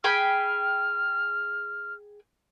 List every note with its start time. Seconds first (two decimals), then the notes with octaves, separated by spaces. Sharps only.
0.04 G#4 G5 B5 F6